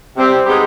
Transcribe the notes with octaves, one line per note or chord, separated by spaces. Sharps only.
C3 G3 C4 G4
G#3 B3 D#4 G4